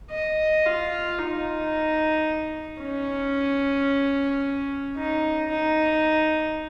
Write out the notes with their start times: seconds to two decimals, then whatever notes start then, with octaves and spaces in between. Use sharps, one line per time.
0.11 D#5
0.66 F4
1.19 D#4
2.81 C#4
4.97 D#4
5.51 D#4